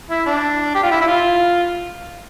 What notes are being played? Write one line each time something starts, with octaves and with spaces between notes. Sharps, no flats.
E4
D4
G4
F4
E4
E4
F4